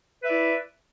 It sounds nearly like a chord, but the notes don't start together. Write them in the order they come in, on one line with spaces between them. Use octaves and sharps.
B4 E5 D5 E4